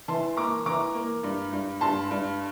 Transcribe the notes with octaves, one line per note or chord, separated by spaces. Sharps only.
E3 A5 C6
A#3 A#5 D6
E3 A#5 D6
A#3
G2
G2
G2 A5 C6
G2